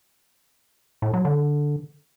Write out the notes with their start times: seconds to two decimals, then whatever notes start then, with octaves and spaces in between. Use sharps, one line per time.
1.02 A2
1.14 F#3
1.25 D3